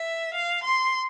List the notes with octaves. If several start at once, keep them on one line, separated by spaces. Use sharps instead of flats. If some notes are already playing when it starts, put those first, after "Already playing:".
Already playing: E5
F5
C6